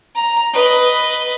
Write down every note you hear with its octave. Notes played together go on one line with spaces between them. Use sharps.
A#5
B4 D#5